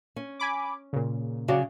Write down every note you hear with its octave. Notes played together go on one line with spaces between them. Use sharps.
C#4
G#5 B5 D6
A#2 C#3
C#3 F#3 F#4 D5